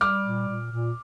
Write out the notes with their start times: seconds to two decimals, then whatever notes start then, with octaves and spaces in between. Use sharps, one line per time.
0.01 G3 D6 F6
0.25 A#2
0.48 A#2
0.72 A#2